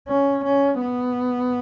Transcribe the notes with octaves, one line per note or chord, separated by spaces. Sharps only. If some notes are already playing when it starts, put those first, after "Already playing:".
C#4
C#4
B3